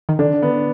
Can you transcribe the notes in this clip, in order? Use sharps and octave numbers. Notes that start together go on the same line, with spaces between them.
D#3
D3 D4
B3